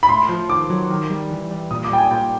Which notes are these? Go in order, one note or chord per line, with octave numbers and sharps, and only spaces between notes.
B5
A2 C6
F3
D#3 D6
F#3
D#3
G3
E3
G3
A#2 D#6
D6
G3 G5
G#5
A#2 G5